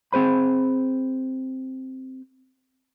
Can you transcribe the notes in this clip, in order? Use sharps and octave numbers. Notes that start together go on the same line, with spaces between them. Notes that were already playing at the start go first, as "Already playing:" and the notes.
C4 G#4 C5 B5